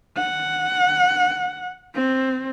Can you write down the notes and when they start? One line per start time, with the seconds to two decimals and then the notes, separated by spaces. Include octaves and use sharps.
0.17 F#5
1.94 C4